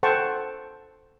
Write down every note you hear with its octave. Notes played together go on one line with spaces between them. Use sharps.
A4 C5 F#5 G5 A5 C#6